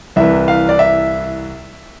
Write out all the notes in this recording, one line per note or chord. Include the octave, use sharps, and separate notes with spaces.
C2 C3 E3 E5
F5
D5
E5